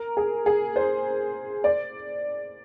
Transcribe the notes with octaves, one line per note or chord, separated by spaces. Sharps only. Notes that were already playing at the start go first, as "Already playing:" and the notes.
Already playing: A#4
G#4
G#4
C5
D5